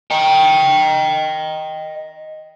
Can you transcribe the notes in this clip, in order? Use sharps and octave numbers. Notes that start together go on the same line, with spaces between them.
D#5 G5